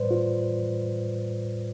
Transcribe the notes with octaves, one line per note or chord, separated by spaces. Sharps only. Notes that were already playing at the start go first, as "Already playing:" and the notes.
Already playing: A2 G3 B4 C5 D5
F4